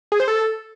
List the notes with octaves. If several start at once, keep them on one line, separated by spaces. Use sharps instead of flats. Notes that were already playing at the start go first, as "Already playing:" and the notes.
G#4
C5
A4